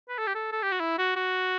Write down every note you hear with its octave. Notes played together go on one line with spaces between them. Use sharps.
B4
A4
G4
A4
A4
G4
F#4
E4
F#4
F#4